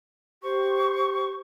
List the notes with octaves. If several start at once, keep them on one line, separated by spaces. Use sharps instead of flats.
G4 C5 C#6